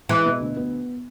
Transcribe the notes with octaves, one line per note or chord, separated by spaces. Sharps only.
E3 G#3
B2
D2
B3